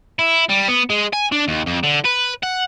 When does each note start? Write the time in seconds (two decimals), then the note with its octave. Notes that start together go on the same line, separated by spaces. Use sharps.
0.19 E4
0.50 G3
0.69 B3
0.90 G#3
1.13 G#5
1.32 D4
1.48 D#2
1.67 F2
1.84 D3
2.05 B4
2.43 F#5